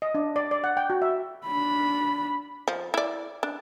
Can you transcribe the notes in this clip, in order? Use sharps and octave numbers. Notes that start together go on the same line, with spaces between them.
D#5
D4
D5
D5
F#5
G5
F#4
E5
D4 B5
F3
E4 D5
D4